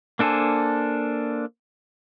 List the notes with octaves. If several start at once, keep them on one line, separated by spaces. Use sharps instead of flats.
A#3 D4 A4 C5 G#5